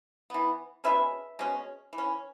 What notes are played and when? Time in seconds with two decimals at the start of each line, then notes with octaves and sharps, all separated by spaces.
0.30 E3 B3
0.84 B2 G#3 C#4 B4 E5
1.39 B2 G#3 C#4
1.93 E3
1.98 C#4